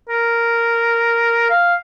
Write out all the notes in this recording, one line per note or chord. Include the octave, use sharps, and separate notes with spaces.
A#4
F5